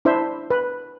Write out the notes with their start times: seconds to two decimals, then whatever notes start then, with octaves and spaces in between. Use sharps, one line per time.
0.05 D4 E4 C5 E5
0.50 B4